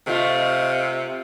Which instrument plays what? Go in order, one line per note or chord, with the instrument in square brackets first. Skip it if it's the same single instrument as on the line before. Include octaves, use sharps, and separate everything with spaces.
[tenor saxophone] C3 [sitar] A3 F4 [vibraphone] D#5 F5